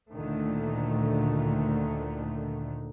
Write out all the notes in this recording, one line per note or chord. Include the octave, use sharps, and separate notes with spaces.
D2 A#2 D3 D#3 A3